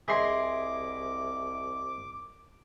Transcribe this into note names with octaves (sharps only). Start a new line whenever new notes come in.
C2 E4 G#4 D#5 C6 D6